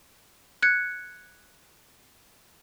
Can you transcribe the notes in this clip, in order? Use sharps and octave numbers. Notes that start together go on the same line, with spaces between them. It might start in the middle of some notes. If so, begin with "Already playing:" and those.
F#6 G#6 C#7